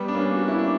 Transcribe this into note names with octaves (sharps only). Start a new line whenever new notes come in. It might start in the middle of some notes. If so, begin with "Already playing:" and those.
Already playing: G3 B3
D4
A#3 C#4
F#4
E4
D4